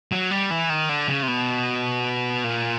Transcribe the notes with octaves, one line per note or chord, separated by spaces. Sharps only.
F#3
G3
E3
D#3
D3
C#3
C3
B2
A#2